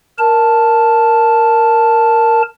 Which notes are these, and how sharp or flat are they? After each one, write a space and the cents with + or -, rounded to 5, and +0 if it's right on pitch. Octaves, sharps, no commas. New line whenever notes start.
A#4 +0 A5 +0